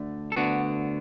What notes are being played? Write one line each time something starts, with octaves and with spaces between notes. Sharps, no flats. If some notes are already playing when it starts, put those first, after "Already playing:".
Already playing: D2 D3 A3
A4
D2 D3 B3 D4 F#4